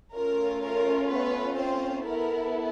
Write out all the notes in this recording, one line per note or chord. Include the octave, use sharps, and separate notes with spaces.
A3 C#4 F4 A#4
A#4
B3 B4
C4 C5
B3 E4 A4 A#4